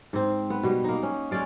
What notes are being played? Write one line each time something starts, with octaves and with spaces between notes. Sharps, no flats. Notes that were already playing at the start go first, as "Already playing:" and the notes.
G#2 C4
B3
B2 G3
A#3 D#4
C#4
G#3 C#4 D5 F5